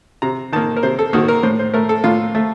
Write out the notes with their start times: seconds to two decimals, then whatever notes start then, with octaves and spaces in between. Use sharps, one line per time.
0.22 C3 A#5
0.53 D#3 A#3 A5
0.76 A#4
0.83 C3 C5
0.99 A4
1.13 D#3 A#3 F#4
1.28 A#4
1.43 A2 C5
1.59 C5
1.74 A3 A#4
1.89 A4
2.04 A2 F4
2.35 A3